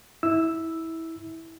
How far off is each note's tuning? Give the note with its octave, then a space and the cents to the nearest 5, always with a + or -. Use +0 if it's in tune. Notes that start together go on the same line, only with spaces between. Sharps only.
E4 -20 E6 +0